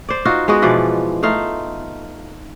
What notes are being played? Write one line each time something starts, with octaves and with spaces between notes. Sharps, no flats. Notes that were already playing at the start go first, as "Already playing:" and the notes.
C5 D5
D#4 F4 F#4
G#3 B3 F#4 D#5
B2 E3 F3 D5
A3 D#4 F4 F5